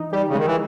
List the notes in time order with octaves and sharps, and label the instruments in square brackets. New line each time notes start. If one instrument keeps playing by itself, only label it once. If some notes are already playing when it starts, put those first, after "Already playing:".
Already playing: [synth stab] E3 D#4
[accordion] G3 [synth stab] G4
[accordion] C#3
[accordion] D#3 [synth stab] G#3
[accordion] E3